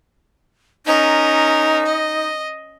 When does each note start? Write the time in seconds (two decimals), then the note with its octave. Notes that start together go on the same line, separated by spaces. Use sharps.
0.86 C#4 D#4 A#4
1.85 D#5